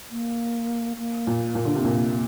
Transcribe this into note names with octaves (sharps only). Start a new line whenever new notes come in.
A#3
A#3
A#2
A#2
D3
C3
A#2